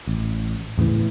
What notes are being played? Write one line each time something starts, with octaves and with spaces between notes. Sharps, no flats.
A1
E2 A2 C#3 E3